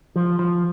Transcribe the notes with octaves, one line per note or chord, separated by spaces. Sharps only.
F3
F3